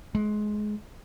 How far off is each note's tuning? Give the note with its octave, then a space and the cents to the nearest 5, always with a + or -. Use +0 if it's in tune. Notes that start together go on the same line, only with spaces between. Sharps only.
G#3 +20